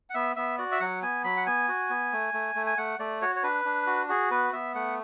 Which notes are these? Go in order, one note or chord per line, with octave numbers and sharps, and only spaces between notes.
F#5
B3 E5
B3 E5
F#4 D5
E5
F#3 F#5
B3 G#5
F#3 B5
F#5
B3 G#5
F#4
B3
A3
A3
A3
G#5
A3 F#5
A3 D5
F#4 C#5
C#5
D4 B4
D4
F#4
F#4 G#4
B3 B4
B3 E5
A3 F#5